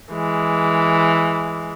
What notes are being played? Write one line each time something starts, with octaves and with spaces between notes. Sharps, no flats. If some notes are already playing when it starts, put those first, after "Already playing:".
E3 G#3